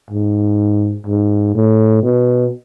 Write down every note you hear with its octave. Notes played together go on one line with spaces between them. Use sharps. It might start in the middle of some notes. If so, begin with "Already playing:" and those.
G#2
G#2
A2
B2